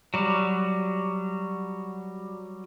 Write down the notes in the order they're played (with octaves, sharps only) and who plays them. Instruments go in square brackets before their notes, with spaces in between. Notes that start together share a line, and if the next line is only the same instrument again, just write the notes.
[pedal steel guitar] F#3 G3